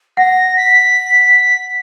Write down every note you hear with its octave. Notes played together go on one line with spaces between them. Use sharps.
F#5 A#6
B6